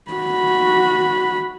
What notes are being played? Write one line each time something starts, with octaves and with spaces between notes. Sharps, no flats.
F#4 B5